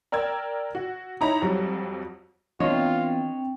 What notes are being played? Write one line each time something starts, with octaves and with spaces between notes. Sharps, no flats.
A#4 D5 G5 E6 G#6
F#4
D#4 E4 C#5 A#5 B5
F2 F#3 G3
E3 B3 C4 D4 F4 C#5 D#5 G5